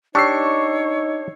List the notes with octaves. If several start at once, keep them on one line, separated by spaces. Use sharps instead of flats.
D4 D#4 G4 C#5 C#6 E6 C7